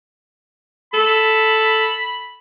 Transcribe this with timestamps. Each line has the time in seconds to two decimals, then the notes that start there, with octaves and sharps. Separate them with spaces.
0.94 A4 B5